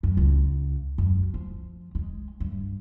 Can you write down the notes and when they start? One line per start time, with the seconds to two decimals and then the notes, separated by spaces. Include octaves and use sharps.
0.03 F#2
0.17 C#2
0.98 F#2
1.34 F3
1.95 G#3
2.40 G2